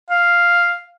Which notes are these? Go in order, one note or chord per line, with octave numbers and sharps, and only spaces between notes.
F5